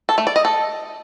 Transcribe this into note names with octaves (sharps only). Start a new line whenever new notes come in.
A4
A3
D5
D#5
A4